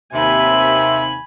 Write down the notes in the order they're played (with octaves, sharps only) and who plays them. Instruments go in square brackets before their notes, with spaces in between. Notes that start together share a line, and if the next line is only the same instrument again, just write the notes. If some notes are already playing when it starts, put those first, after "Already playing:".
[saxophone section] D#2 C3 [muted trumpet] E5 [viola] G#5 B5